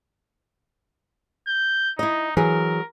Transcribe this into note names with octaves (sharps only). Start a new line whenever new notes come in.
G6
D#4 E4 D#5
E3 F#3 G#4 A#4